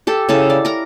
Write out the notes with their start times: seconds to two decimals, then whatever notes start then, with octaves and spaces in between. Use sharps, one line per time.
0.07 G4 A4
0.29 C#3 E4 A4 F5
0.50 D5
0.65 A#4 A#5